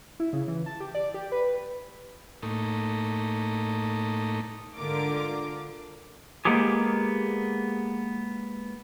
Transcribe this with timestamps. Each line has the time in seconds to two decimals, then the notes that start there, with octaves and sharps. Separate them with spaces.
0.20 E4
0.33 C#3
0.48 E3
0.66 A5
0.80 G4
0.95 D5
1.14 G4
1.32 B4
2.43 A2 A3 A#3 D#4
4.77 G#2 D3 F4 A#4 D6
6.45 G#3 A#3 B3 G4 G#4